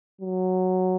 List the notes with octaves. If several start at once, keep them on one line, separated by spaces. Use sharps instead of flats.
F#3